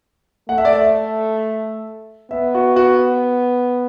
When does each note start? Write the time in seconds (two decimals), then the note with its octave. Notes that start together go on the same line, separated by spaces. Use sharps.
0.49 A3 F#5
0.58 E5
0.65 D5
0.73 E5
2.31 B3 E5
2.55 F#4
2.76 F#4